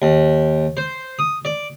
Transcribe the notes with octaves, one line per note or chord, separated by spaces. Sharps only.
D#2
C5
D#6
D5